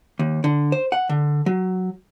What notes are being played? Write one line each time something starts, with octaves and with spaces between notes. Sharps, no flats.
D#2
D3
C5
F#5
D3
F#3